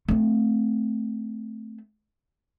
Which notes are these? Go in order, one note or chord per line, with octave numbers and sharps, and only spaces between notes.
A3 C4